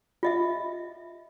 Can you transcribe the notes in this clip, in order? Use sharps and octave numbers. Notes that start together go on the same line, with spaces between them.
F4 D#5 E5